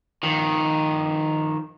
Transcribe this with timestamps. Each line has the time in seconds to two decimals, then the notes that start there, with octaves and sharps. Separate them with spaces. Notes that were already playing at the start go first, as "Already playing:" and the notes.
0.23 D#3 F3